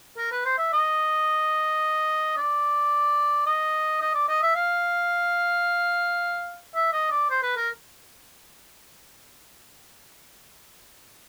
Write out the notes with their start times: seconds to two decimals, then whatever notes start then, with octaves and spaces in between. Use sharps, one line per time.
0.18 A#4
0.32 B4
0.45 C5
0.58 E5
0.73 D#5
2.37 D5
3.46 D#5
4.01 D#5
4.14 D5
4.28 D#5
4.42 E5
4.56 F5
6.75 E5
6.93 D#5
7.11 D5
7.30 C5
7.43 B4
7.56 A#4